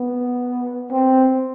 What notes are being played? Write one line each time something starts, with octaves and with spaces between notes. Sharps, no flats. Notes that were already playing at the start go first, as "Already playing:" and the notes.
Already playing: B3
C4